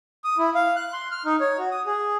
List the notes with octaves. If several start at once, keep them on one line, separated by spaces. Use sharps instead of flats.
D#6
E4
F5
F#6
C6
F6
D#4
C#5
F#4
D#6
G#4